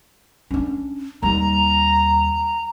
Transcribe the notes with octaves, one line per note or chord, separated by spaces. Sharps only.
C#4 D4
D#2 G3 A#5